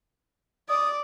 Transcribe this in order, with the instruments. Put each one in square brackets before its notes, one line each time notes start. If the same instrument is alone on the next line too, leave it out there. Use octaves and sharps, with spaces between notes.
[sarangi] D5 [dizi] D#6